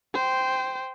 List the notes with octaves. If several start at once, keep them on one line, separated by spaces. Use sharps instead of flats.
C5 G5